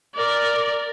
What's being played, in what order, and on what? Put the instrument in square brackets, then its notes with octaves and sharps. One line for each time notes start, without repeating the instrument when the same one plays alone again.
[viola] A#4 D5